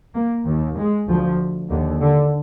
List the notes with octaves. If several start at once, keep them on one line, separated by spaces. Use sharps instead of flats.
A#3
D#2
G#3
D2 F3
D#2 D3
D3